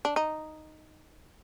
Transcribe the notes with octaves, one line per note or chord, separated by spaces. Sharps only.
D4
D#4